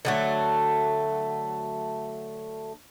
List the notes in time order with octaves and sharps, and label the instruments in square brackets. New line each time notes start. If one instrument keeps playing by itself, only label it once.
[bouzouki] D3 F#3 A3